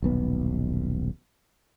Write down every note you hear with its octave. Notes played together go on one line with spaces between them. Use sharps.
D#1 B1 B3